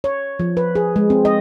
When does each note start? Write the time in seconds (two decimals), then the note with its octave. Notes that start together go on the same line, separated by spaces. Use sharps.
0.04 C#5
0.39 F3
0.57 B4
0.75 G#4
0.96 G#3
1.10 C4
1.25 D#5